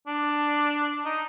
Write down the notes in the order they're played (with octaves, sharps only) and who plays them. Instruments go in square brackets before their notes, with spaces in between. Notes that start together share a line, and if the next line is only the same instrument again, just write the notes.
[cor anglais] D4
D#4